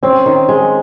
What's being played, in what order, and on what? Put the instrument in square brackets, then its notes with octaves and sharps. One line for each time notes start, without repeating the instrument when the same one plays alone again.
[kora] C4 [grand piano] C#4
[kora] D#3
G#3